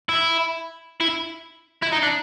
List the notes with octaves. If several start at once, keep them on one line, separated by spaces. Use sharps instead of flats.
E4
E4
E4
D#4
D4